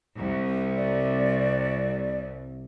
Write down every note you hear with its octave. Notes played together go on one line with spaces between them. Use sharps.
C2
D5